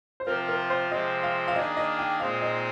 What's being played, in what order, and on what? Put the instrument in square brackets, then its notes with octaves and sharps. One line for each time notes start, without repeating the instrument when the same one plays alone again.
[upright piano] C5
[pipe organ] C3 F3 C4 F4 [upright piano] A#4
[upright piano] A#4
C5
[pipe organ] C3 F3 G#3 C4 [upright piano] D#5
[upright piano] F5
F5
[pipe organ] D#3 A#3 D4 G#4 [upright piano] D#5
[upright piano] D#5
G5
[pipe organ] A#2 G#3 C4 D#4 G#4 [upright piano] F5
[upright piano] D#5